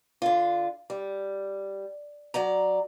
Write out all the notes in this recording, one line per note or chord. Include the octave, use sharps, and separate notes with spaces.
D3 F4
G3
F#3 D5 A#5